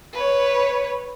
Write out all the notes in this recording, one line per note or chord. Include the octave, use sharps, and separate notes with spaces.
B4 C#5